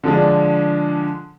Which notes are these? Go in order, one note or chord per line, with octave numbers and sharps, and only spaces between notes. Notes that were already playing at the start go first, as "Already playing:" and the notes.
D3 F3 G#3 D4